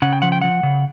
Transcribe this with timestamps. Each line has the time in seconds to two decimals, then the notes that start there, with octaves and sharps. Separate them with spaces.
0.02 C#3 F#5
0.13 G5
0.22 F3 F#5
0.32 G5
0.41 F3 F#5
0.63 C#3